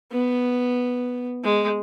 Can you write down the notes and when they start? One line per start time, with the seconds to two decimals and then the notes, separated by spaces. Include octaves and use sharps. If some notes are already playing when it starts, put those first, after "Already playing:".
0.12 B3
1.44 G#3